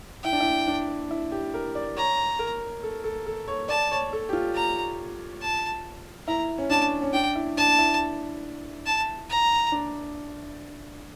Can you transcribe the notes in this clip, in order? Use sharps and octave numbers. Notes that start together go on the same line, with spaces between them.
E4 G5
D4
E4
D4
E4
G4
A#4
D5
C#5 A#5
A#4
A4
A4
A4
C#5
D5 A5
C#5
A4
G4
F4
A#5
A5
E4 A#5
C#4
D4 A5
C#4
D4 G5
E4
D4 A5
E4
A5
A#5
D4